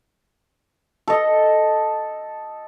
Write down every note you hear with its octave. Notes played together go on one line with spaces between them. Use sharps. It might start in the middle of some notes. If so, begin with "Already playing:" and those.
A4 D#5